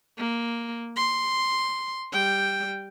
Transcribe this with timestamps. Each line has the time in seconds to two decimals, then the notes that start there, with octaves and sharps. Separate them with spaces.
0.19 A#3
0.96 C6
2.12 G3 G5